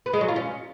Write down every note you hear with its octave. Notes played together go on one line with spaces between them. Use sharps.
B4
G#3
F#3
F4
C#4